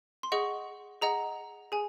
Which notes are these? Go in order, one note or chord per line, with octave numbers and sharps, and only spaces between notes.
C6
G#4 D#5 F#5 C#6
G#4 D#5 F#5 A#5
G#4 G#5